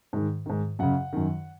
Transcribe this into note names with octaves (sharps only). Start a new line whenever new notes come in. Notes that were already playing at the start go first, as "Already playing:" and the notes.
G#2 D#3
G#2 D#3
F#2 C#3 F#5
F#2 D#3